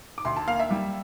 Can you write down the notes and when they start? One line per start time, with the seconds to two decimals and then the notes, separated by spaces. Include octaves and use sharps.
0.18 D6
0.25 D2 C6
0.36 A5
0.47 A#3 F5
0.60 E5
0.71 G3